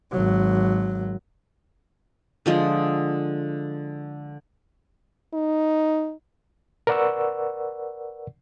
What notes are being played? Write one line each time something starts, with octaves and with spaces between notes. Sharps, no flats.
G#1 F#3
D3 F3 G#3
D#4
A#4 B4 D5 F#5 C#6 E6